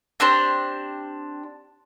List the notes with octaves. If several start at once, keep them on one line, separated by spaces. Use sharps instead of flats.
C4 D4 G4 C5